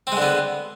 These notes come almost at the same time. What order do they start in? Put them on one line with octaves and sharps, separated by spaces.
C4 G#3 D3 B3